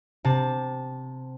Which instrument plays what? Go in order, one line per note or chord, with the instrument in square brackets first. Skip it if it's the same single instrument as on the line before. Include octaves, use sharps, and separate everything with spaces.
[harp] C3 A5